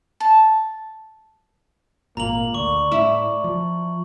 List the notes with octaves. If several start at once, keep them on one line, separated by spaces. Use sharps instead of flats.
A5
G#1 A#2 A#3 A#5 F#7
D2 D5 C#6
A2 E4
F3